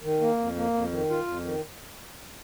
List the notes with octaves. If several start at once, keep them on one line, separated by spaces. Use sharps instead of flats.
D#3
A#3
F2
A#3
F2
D#3
F4
F2
D#3